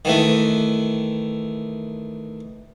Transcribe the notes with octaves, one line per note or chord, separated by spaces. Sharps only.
D#3 E3 A3